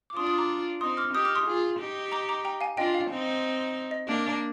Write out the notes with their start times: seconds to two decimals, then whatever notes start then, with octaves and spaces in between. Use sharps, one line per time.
0.10 D6
0.16 D4 F4 C6 D#6
0.27 C6 D#6
0.38 A#5 D6
0.81 C4 D#4 C6 D#6
0.97 D6 F6
1.14 D#4 G4 D#6 G6
1.25 D6 F6
1.35 C6 D#6
1.46 F4 G#4
1.80 D#4 G4
2.12 A#5 D6
2.29 A#5 D6
2.45 G5 A#5
2.61 F5 G#5
2.77 D4 F4 D#5 G5
2.94 F5
3.10 C4 D#4
3.91 D#5
4.08 A#3 D4